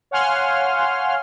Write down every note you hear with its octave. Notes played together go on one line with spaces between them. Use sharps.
C#5 F5 F#5 G#5 C6 F6